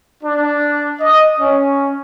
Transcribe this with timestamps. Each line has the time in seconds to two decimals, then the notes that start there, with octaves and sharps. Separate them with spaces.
0.23 D4
1.00 D#5
1.39 C#4